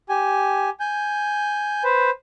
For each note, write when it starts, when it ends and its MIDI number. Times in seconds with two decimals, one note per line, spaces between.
0.09 0.70 67
0.09 0.70 80
0.80 1.83 80
0.80 1.83 91
1.84 2.10 71
1.84 2.10 72